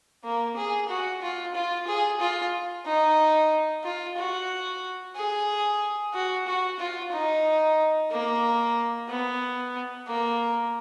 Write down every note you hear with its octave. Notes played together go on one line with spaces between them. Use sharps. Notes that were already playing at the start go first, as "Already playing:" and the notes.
A#3
G#4
F#4
F4
F4
G#4
F4
D#4
F4
F#4
G#4
F#4
F#4
F4
D#4
A#3
B3
A#3